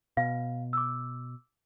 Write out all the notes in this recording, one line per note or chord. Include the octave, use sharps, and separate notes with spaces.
B2 F5
D6 E6